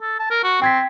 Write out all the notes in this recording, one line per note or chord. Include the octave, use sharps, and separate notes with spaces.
A4
A5
A#4
F#4
C4 G5 G#6 B6